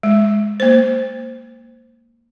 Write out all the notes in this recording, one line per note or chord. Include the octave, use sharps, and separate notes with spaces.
G#3
A#3 C5